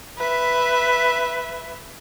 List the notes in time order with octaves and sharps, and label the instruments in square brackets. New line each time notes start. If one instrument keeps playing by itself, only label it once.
[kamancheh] B4 E5